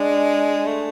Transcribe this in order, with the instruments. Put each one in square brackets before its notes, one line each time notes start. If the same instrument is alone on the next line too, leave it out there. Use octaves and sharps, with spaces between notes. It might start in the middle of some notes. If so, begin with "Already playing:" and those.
Already playing: [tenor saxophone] G#3 [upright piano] D4
[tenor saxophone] A3